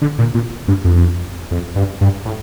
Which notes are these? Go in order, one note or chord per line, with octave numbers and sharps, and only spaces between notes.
D3
A#2
A#2
G2
F2
F2
G2
G2
A2